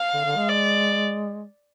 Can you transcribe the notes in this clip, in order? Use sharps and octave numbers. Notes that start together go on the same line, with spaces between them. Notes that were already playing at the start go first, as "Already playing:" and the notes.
Already playing: F5
D3
D3
G#3
D5